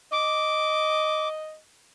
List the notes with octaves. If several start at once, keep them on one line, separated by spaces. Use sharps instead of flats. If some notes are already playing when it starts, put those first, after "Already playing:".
D#5 D6